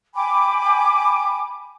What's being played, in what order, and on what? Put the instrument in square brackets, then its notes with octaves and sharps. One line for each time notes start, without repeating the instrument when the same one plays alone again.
[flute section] G5 G#5 B5 D6